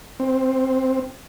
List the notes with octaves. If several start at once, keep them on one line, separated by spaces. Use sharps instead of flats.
C4